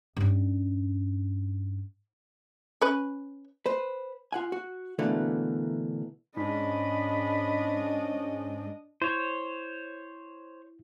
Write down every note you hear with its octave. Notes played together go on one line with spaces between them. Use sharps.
G2 C#4
C#4 B4
B4 C5
F4 F#5 G#5
F#4
B2 D3 E3 A3 A#3
G#2 C#4 D4 D#5 B5
E4 C5 C#5